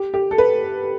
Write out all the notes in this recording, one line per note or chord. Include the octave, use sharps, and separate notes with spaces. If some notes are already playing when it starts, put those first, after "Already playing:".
Already playing: G4
G4
A4
B4